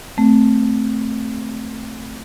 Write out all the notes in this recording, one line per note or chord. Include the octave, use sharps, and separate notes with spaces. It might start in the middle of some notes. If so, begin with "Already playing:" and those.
A3 C4